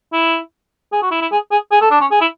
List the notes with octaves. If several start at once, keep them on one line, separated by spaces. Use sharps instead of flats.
E4
G#4
F#4
E4
E4
G#4
G#4
G#4
A4
D4
C#4
G#4
E4